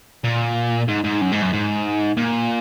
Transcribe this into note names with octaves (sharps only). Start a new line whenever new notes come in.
A#2
G#2
G#2
F#2
G#2
F#2
G#2
A#2